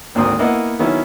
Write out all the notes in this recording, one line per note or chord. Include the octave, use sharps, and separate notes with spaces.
G#1 D2 G#2 A#3 C4 D#6
A#3 B3 E4 D#5 F#5
D#3 F#3 B3 C#4 E4